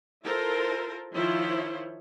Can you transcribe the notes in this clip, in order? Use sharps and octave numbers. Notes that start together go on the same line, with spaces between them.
E4 F4 A4 A#4 C5
D#3 F3 E4 F4 C5 C#5